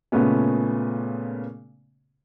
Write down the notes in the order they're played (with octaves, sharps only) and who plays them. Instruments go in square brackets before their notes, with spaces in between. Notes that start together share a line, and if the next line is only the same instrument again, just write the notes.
[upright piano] A#2 C#3 A3 B3 C#4